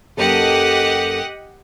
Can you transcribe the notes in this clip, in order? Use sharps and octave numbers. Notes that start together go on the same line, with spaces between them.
F#2 A#3 G4 A4 D#5 F#5